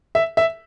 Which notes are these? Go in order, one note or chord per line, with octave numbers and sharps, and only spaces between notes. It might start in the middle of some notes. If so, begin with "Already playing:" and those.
E5
E5